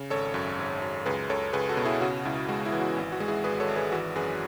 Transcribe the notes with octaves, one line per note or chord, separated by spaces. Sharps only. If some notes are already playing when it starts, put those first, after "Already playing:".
Already playing: C#3
G#1 A4 C#5
F#2
G#1
F#2
C#2 G#4 B4
C#2 A4 C#5
C#2 G#4 B4
F#4 A4
B2
E4 G#4
C#3 F#4
C#2 E4
G#3 F#4
E4
E3
F#4
G#1
F#4
G#3
E4 G#4
G#1 G#4 B4
A4 C#5
G#1
G#4 B4
E3 F#4
F#2 G#4 B4